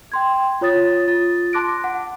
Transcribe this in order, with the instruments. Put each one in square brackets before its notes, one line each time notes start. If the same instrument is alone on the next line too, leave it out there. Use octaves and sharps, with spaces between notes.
[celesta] G5 C6 G#6
F4 C#5 D#6 A6
F4 A6
A5 C6 D6 F#6 A#6 D7
F#5